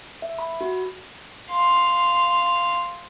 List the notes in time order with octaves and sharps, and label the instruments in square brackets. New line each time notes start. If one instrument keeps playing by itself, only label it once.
[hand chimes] E5
B5
F#4
[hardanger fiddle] F5 C6